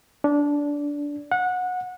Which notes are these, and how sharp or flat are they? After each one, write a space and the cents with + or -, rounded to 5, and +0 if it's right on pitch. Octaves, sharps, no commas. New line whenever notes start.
D4 -15
F#5 -20